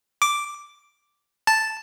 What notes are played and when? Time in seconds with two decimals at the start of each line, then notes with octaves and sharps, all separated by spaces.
0.22 D6
1.47 A5